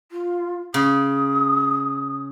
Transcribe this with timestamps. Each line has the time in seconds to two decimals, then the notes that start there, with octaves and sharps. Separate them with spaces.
0.12 F4
0.74 C#3 D#6